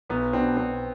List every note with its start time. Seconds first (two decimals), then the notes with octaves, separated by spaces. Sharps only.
0.09 B1 B3
0.33 B2 B3 C4 D4
0.57 B1 C4